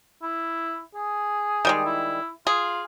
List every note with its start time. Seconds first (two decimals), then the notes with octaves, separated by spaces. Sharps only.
0.22 E4
0.95 G#4
1.65 D#3 G3 G#3
1.85 E4
2.47 F4 G#4